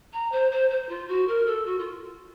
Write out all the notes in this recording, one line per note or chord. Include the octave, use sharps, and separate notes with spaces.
A#5
C5
C5
C5
F4
F#4
A#4
A4
F#4
F4